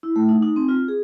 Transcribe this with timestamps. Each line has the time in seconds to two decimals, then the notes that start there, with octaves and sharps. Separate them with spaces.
0.03 E4
0.16 A3
0.29 D#4
0.42 D#4
0.56 C4
0.69 F4
0.88 G#4